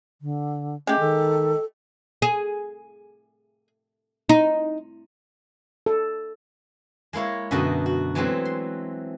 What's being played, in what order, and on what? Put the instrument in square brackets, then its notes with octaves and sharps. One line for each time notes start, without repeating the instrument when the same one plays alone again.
[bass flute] D3
[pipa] G#3 G4 [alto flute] A3 [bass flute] C#4
[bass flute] D#3 [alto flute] A4
[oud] G#4
D#4
[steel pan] A4
[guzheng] G#3 A#3 E4 C#5
F#2 B2 D3 F#4 D#5 G5
F#4
E3 F#3 G#3 A3 C4
C6